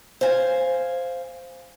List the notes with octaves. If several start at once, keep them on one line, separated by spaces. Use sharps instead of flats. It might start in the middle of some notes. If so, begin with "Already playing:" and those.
C5 F5 G#5